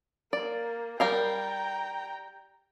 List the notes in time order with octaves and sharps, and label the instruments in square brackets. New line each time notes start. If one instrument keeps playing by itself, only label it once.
[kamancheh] A#3 [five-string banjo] D5
[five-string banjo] G3 A#4 F5 [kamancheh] G5 A#5